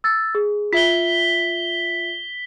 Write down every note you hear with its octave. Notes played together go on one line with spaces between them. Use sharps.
E6 A6
G#4
F4 E5 B6 G7